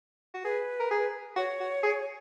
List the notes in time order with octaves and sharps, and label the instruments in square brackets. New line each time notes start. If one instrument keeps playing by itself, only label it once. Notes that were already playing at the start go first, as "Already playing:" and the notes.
[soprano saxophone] F#4
[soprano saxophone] G#4 [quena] B4
[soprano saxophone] A#4
G#4
[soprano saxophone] F#4 [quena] C#5
[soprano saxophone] F#4
G#4